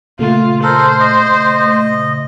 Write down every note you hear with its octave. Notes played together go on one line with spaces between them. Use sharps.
A#2 C#3 A3 F4
A4 A#4 C5
D#5